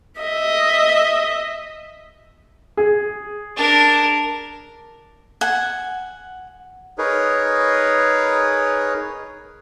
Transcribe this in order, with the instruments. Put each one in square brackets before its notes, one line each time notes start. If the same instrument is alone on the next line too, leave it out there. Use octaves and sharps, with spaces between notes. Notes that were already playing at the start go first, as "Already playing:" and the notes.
[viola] D#5 E5
[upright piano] G#4
[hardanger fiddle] D4 A#4
[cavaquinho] F#5 G#5
[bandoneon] D#4 G#4 A#4 B4 C#5